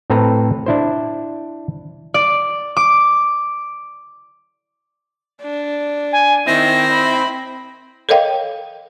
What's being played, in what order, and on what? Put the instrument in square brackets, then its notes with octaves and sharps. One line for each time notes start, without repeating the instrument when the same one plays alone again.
[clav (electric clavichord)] A2 C4 A4 B4 A#5
D4 E4 C5
[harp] D5
D6
[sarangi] D4
[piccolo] G#5
[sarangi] D#3 [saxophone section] C4 E4 [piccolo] A#6
[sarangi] B5
[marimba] A4 A#4 C#5 D#5 F5 G5